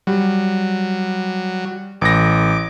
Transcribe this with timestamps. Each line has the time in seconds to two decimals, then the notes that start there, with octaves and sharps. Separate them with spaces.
0.07 F#3 G3
2.01 A1 D6 A#6